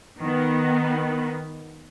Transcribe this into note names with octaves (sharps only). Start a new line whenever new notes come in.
D#3 B3